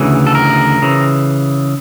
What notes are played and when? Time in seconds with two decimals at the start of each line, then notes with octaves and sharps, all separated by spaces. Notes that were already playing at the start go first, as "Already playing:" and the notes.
Already playing: D2 C#3 E3
0.27 A4
0.35 A#4
0.82 C#3 E3